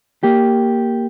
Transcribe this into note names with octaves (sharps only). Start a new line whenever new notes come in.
A#3 G4